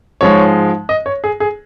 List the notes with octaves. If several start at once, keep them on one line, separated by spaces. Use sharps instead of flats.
G#2 F3 G#3 C#5
D#5
C#5
G#4
G#4